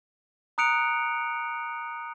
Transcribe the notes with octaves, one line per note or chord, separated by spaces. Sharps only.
A#5 D#6 F#6 C#7 D7 F7